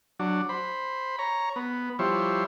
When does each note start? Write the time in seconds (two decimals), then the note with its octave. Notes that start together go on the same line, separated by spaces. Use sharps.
0.19 F#3 D4
0.49 C5 B5
1.19 C#5 A#5
1.56 B3
1.99 F3 G3 E4 C5 C#5